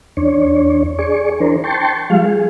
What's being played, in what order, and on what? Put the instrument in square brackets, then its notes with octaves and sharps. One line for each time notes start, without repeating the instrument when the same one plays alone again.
[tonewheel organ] E2 D4 C#5
G#4 D5 C#6
E3 D4 A#4 C5
G5 A5 C6 C#6
F3 G3 G#3 F5
G#4